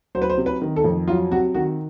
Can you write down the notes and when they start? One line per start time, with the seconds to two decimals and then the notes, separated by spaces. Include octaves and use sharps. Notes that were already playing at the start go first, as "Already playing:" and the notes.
0.15 F#3 C5
0.22 B4
0.30 C5
0.38 C3
0.46 B4
0.62 D#3
0.76 A4
0.84 F2
1.08 F#3 F4
1.31 C3 F#4
1.55 D#3 F#4